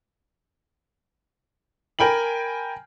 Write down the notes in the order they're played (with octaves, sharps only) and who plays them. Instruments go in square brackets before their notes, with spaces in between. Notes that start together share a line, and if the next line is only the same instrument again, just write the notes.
[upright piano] A#4 G5 G#5 B5 F#7